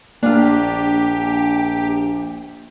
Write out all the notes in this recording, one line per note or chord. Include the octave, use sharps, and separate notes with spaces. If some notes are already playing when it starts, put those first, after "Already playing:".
A#1 A#3 D4 F4 G4